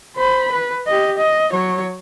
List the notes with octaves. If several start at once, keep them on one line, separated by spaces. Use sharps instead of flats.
C5 B5
B4
G4 D#5
D#5
F#3 C#5